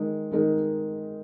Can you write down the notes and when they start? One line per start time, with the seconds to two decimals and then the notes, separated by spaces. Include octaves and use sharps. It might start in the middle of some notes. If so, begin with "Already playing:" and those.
Already playing: D#3 G#3 D#4 A#4
0.31 D#3 G#3 D#4 A#4